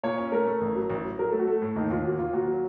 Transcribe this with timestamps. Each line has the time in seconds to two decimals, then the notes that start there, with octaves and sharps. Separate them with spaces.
0.03 A#2 C#5
0.18 C#4
0.32 A3 A#4
0.47 A3
0.61 A1
0.75 F#3
0.90 A1
1.04 F#3
1.19 F#3 A#4
1.29 A3 A4
1.39 F#4
1.47 A3 A4
1.62 A2
1.76 D#2 D#4
1.90 D#2 F4
2.04 A#3 F#4
2.19 D#2 F4
2.33 A#2 F#4
2.48 F#3